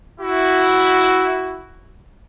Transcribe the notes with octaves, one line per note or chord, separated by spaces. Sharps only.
E4 F#4